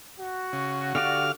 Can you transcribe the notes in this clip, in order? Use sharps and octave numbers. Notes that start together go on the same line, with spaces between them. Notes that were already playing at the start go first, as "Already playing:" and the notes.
F#4
C#3
D3 G4 D5 F5 F6